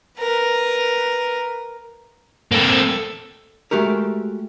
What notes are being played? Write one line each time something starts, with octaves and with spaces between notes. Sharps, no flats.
A#4 B4
A#3 C4 A4
G#3 A3 F#4 G4 A#4